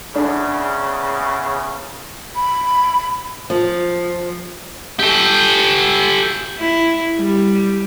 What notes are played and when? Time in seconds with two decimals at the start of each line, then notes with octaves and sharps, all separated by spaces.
0.15 E2 C#3 D4
2.35 B5
3.50 F3
4.99 G4 A4
6.58 E4
7.18 G3